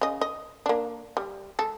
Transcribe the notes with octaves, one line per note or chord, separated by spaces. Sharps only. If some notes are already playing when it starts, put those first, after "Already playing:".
C#3 D#5
D#5
A#3 D4
G3
G#3 A4